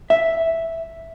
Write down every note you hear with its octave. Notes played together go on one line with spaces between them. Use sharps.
E5